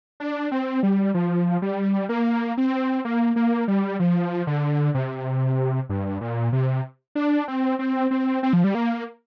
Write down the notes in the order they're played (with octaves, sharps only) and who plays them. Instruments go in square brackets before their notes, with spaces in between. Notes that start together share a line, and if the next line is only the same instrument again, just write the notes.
[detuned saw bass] D4
C4
G3
F3
G3
A#3
C4
A#3
A#3
G3
F3
D3
C3
G2
A#2
C3
D4
C4
C4
C4
C4
F3
G3
A#3